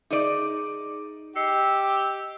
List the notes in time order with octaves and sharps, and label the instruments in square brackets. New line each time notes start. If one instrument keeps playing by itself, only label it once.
[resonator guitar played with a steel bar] D#4 D5 [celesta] G#4 D6 D#7
[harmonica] G4 [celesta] D#5 C7 C#7 [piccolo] E6